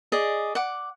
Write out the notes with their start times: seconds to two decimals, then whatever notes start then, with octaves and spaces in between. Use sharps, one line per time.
0.12 G#4 D5 D#5
0.55 F#5 D6